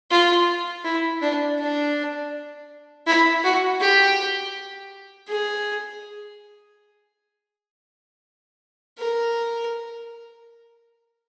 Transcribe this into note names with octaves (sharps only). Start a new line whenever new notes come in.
F4
E4
D4
D4
E4
F#4
G4
G#4
A#4